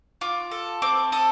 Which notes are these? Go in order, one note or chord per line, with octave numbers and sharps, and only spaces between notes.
F4 D6
A4
C4 D6
A4 D#6